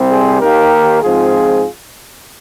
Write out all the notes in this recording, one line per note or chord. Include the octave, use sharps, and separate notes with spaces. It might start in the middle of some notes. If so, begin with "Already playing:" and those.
Already playing: C2 C3 G3 C4
G#4 C5
D#2 D#3 A#3 G4 A#4
G#2 F3 C4 F4 G#4